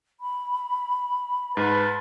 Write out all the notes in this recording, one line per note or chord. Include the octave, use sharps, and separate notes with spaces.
B5
G#2 B4 A5 B5